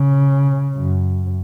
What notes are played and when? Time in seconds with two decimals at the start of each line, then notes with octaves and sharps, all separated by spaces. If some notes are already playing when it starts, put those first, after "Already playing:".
Already playing: C#3
0.76 F#2